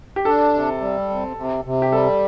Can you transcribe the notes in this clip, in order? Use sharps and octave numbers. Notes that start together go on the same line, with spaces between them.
G4
D4 A4
C3
G3
C3
C3
C3
G4
G3 A4